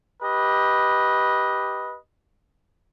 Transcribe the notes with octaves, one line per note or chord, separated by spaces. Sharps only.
G4 B4 D#5